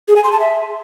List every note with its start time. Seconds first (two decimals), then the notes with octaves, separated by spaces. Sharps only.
0.08 G#4
0.16 G#5
0.24 C6
0.32 A5
0.40 E5